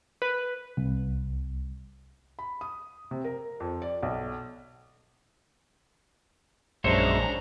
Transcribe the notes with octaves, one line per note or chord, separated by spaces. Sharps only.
B4
C2
B5
D#6
C3
A#4
F2
D5
B1
A#1 F#2 G#3 D4 C5 C#5 E5 A#5